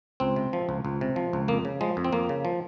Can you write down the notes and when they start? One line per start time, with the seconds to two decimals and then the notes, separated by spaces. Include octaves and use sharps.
0.20 C#2 C4
0.36 C3
0.53 F3
0.69 C#2
0.85 C#2
1.01 C3
1.16 F3
1.33 C#2
1.48 F2 A#3
1.65 C#3
1.81 F3 G#3
1.97 F2
2.04 C4
2.12 F2 A#3
2.29 C#3
2.45 F3